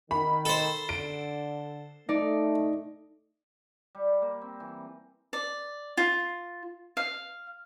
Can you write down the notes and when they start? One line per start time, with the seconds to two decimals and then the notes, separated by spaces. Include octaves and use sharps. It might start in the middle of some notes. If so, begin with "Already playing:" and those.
0.11 D#3 B5
0.45 A4 C5
0.89 D3 D7
2.09 A3 D#4 D5
3.95 G3
4.22 A#3
4.41 C4
4.60 E3
5.33 D5
5.97 F4
6.97 F5